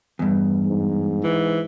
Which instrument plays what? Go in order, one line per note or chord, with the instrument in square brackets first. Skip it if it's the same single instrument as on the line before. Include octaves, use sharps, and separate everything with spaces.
[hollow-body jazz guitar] E2 G2
[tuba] G#2
[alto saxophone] E3